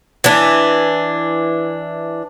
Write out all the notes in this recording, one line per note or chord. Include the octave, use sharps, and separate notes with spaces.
E3 D4